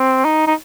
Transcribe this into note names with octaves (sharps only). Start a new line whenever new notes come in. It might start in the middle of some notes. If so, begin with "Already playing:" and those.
Already playing: C4
D#4
D#4